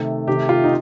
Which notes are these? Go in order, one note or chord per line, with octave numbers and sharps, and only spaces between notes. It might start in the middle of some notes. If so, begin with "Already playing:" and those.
Already playing: C3 D#3 A3
C3 D#3 A3 G4
F4
D#4